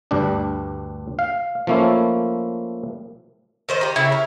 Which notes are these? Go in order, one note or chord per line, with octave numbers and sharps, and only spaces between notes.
D2 G2 G3 D4
F5
F3 A3 A#3 C#4 E4
D#3 C5 D#5
D#4 G4
C#3 E4
A#4